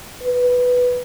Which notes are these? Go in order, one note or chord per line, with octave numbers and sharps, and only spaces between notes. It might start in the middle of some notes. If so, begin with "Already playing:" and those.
B4